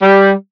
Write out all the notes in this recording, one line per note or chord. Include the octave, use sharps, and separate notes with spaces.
G3